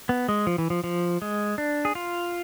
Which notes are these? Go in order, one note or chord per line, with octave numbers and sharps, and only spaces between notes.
B3
G#3
F3
E3
F3
F3
G#3
D4
G#4
F4